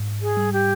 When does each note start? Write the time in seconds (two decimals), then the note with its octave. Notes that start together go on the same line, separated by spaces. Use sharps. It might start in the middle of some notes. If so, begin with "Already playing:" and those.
Already playing: G#2
0.22 G#4
0.37 G3
0.53 G4